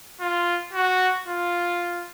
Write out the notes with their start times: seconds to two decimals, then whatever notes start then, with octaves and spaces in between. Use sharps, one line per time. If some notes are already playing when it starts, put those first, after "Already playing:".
0.21 F4
0.73 F#4
1.28 F4